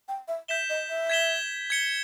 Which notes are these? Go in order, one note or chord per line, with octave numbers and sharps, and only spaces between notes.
G5
E5
E5 G6 B6 E7 G7
D#5
E5
G#6 B6 E7 G7
G#6 C#7 G7